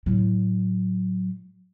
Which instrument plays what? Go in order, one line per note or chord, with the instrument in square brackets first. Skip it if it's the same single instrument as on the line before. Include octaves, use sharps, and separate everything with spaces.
[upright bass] A2 F#3